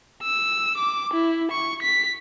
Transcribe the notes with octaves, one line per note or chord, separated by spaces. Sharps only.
E6
D6
E4
C#6
B6